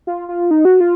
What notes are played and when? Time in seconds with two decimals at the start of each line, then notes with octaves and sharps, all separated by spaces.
0.07 F4
0.29 F4
0.51 D#4
0.65 F#4
0.80 F4